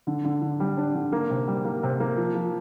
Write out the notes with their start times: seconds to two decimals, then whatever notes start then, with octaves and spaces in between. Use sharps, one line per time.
0.07 D3
0.25 D3
0.42 D3
0.60 G3
0.77 D4
0.95 D3
1.12 A#3
1.30 C3
1.47 G3
1.65 A#3
1.83 C3
2.00 A#3
2.17 F3
2.35 F3